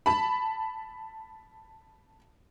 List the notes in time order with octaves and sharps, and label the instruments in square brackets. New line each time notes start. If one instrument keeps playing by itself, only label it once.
[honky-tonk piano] A5 B5